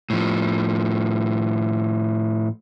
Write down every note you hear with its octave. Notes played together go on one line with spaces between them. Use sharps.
A2 F3